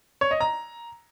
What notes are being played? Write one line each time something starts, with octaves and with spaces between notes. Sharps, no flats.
C#5
D#5
A#5